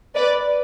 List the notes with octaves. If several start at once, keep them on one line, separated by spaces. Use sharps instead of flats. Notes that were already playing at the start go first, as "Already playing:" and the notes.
B4 D5